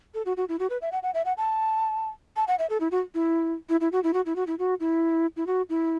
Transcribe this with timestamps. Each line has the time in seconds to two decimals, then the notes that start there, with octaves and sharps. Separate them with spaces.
0.14 A4
0.26 F#4
0.37 F#4
0.49 E4
0.59 F#4
0.70 B4
0.82 E5
0.92 F#5
1.03 F#5
1.14 E5
1.25 F#5
1.37 A5
2.36 A5
2.48 F#5
2.59 E5
2.70 A4
2.80 E4
2.91 F#4
3.14 E4
3.69 E4
3.81 E4
3.92 F#4
4.04 E4
4.13 F#4
4.26 E4
4.36 F#4
4.47 E4
4.59 F#4
4.80 E4
5.36 E4
5.47 F#4
5.69 E4